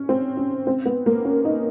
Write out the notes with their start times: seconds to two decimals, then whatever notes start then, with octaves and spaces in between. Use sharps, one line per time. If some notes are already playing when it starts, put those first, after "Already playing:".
Already playing: C#4
0.09 C4
0.37 C#4
0.67 C4
0.86 B3
1.06 A#3
1.25 C#4
1.45 D#4